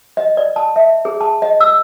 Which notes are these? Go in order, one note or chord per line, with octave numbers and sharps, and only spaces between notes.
D#5
D5
A5
E5
G#4
A5
D#5
E6